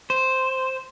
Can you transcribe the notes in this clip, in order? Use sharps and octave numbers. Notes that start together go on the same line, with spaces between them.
C5